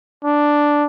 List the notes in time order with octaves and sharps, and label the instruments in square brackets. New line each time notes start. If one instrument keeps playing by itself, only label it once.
[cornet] D4